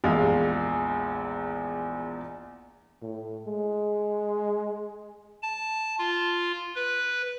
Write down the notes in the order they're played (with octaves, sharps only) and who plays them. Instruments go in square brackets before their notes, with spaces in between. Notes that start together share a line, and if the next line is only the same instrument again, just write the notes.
[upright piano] A#1 E2 G#3 F5
[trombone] A2
G#3
[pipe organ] A5
F4
B4